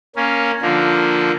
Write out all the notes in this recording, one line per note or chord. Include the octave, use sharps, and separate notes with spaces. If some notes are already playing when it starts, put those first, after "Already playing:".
A#3 C#4
D3 F3 A#3